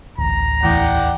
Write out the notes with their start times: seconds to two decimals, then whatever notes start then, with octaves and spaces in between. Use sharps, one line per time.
0.18 D1 A1 A#5
0.63 E2 A2 E3 D5 F#5 G5